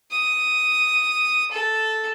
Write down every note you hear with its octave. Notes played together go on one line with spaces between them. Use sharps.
D#6
A4